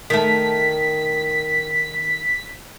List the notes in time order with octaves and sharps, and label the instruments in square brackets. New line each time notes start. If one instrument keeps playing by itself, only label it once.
[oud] D#3 A3 [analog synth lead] B6